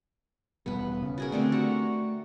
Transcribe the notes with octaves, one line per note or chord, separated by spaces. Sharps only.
E1 B2 G3 B3 B4
C#3
F#4 G#4 A#4
D3 A3 C4 G4
F#4 A#5 C#6